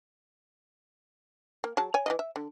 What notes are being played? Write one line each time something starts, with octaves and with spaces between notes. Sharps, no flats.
A#3
F#3 G#4 A5
C#5 G#5
E3 G#3 D#5
E5
D3